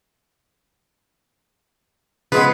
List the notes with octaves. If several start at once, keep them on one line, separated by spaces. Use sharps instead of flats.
C#3 F3 G#3 B3 B4